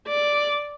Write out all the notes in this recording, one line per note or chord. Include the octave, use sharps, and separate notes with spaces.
D5